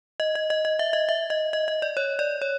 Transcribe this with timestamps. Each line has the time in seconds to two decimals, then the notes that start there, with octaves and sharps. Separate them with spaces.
0.20 D#5
0.35 D#5
0.50 D#5
0.65 D#5
0.79 E5
0.93 D#5
1.09 E5
1.30 D#5
1.53 D#5
1.68 D#5
1.82 D5
1.97 C#5
2.19 D5
2.42 C#5